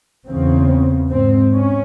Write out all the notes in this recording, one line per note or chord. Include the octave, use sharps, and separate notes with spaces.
E2 C#3 C4
G#2 C4
C#4